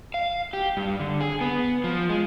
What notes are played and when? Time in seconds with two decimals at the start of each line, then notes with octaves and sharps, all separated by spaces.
0.14 F5
0.53 G4
0.77 G2
1.00 D3
1.21 G#4
1.41 B3
1.84 F3
2.10 G#3